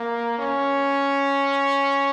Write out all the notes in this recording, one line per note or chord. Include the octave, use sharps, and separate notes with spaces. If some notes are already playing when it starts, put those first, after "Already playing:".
Already playing: A#3
C#4